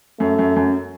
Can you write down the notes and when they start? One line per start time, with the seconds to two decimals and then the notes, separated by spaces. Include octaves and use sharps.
0.20 F#2 A3
0.39 F#2
0.56 F#2